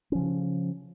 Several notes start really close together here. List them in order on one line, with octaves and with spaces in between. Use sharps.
C#4 F3 C#3